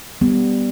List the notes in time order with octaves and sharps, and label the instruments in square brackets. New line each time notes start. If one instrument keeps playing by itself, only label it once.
[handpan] G3 B3